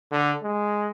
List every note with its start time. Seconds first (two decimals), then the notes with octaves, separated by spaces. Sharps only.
0.11 D3
0.42 G#3